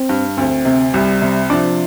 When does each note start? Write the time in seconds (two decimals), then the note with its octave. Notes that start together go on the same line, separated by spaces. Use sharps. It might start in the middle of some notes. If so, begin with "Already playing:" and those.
Already playing: C4
0.09 G2
0.37 D2 C4
0.65 C3
0.93 C2 G3
1.22 C3
1.50 F3 D4